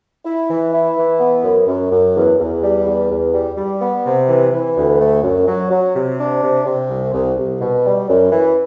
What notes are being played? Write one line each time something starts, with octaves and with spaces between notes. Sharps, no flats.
E4
E3
E4
E3
B3
F#2
F#2
F#2
E2
E2
G3
E2
E2
G3
G3
B3
C3
E3
E3
D2
A3
F#2
F#3
F#3
C3
D4
C3
C3
C2
C2
C2
B2
G3
F#2
E3